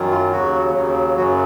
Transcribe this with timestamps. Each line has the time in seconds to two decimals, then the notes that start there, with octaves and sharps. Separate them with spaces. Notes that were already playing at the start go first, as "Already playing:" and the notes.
Already playing: F#2 D#3 F#3
0.11 F4
0.32 D#2 C#3 F#3 F#4
0.74 D#2 C#3 F#3
1.17 F#2 C#3 F#3 F#4